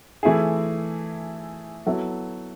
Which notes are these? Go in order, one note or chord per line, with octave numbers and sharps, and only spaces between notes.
E3 A3 E4 G#4
F#3 B3 E4 A4